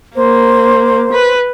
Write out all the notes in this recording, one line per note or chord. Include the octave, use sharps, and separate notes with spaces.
A#3 C5
B4